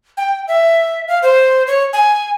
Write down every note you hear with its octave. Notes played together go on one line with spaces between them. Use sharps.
G5
E5
F5
C5
C#5
G#5